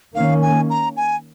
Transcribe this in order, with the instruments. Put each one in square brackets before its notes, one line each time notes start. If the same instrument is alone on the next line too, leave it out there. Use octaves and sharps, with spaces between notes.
[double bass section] D#3 A#3 C#4 [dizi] F5
[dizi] G#5
A#5
G#5